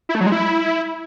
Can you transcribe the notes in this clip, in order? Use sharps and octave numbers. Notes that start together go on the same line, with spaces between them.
E4
A3
F#3
G#3
E4